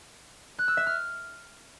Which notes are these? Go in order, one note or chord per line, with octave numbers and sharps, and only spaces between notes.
F#6
E6
E5
F6